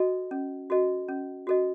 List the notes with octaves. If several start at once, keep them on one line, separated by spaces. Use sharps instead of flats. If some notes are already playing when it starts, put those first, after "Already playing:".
Already playing: F#4 A4 D#5
C#4
F#4 A4 D#5
C#4
F#4 A4 D#5